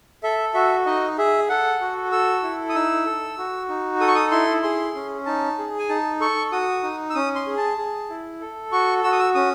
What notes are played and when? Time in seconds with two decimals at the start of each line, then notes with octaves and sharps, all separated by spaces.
0.23 A4 E5
0.54 F#4 E5
0.86 D#4 D#5
1.18 G#4 E5
1.49 A4 F#5
1.81 F#4
2.12 A4 E6
2.43 E4
2.69 D#6
2.75 D#4 E6
3.06 A4
3.38 F#4
3.69 D#4
4.00 A4 D#6
4.08 C#6
4.15 D#6
4.31 E4 C6
4.63 G#4 C6
4.95 C#4
5.26 D#4 A5
5.58 G#4
5.79 G#5
5.89 D#4 A5
6.20 A4 C#6
6.52 F#4 D#6
6.83 D#4
7.10 E6
7.14 C#4 D#6
7.35 C6
7.46 G#4
7.57 A5
7.78 G#4
8.10 E4
8.41 A4
8.72 F#4 C#6
9.04 F#4 E6
9.12 D#6
9.19 E6
9.35 C#4 D#6